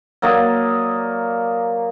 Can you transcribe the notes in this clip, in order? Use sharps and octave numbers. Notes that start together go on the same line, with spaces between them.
F#3 A#3 D5 D#5